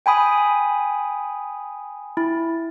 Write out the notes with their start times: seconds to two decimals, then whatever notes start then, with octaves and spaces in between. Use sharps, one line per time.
0.06 G5 G#5 B5 D#6
2.17 E4